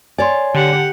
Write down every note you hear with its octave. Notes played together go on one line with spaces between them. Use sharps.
C#5 D5 G#5 C6
D3 G4 F#5